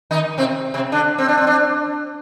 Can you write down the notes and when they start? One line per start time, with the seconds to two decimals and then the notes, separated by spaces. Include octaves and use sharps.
0.11 D#3 D#4
0.38 C3 C4
0.74 C3 C4
0.92 D3 D4
1.18 C4
1.28 D4
1.38 C4
1.47 D4